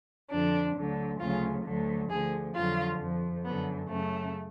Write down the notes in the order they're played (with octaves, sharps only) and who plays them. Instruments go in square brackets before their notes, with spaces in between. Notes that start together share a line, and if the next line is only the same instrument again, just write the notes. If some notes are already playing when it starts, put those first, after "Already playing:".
[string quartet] F2 D3 F3 D4
D2 D3 F#3
D2 C#3 F#3 F4
D2 D3 F#3
D2 D3 F3 G#4
F2 D3 F#3 F4
F2 F3
F#2 D3 F#3 B3
F#2 C#3 F#3 A3